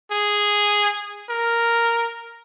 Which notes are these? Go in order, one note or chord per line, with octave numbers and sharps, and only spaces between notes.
G#4
A#4